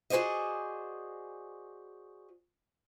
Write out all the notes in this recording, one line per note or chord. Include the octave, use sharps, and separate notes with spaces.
F#4 G#4 C5 D5 D#5